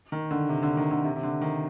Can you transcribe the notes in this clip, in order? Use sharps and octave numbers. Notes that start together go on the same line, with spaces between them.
D#3
D3
C3
D3
D#3
D3
C3
C3
D3
D#3